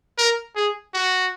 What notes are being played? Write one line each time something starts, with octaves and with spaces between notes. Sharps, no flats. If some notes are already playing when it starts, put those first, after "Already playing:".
A#4
G#4
F#4